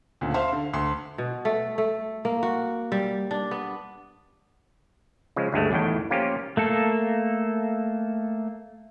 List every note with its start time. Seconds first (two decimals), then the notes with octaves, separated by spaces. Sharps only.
0.21 D2 A#2 C#3
0.34 C5 E5 F5 C6
0.53 D3
0.73 D2 C6
1.18 B2
1.45 A3
1.78 A3
2.25 A#3
2.43 F#4
2.92 G3
3.31 D4
3.51 B3
5.36 C#3 F3 G#3
5.52 D2 G2 G#3 A3
5.71 A1 E2 A2 D#3 G5
6.11 F3 A#3 C#4 F4 G4
6.57 A3 A#3 A4